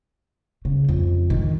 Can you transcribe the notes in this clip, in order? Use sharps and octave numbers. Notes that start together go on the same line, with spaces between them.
C#3
F2
D#3